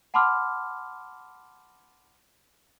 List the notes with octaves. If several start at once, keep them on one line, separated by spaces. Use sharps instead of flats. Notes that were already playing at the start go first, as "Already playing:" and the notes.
F#5 A5 B5 C6 D6 F6